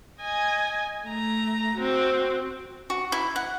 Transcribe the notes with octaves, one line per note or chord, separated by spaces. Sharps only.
D#5 G#5
A3 A#5
C4 F#4
F#4
E4
F#5